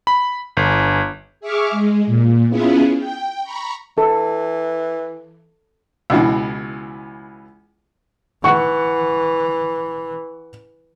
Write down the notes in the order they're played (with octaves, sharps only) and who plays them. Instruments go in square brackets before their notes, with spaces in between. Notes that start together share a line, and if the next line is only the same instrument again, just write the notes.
[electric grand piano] B5
G1
[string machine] G#4 E5 C#6 D6 F6
G#3
A#2
B3 C#4 E4 F4 G#4
G5
A#5 B5 C#6
[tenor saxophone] E3 [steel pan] A4
[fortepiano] C#2 B2 E3
[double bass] E3 [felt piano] F#5 C#6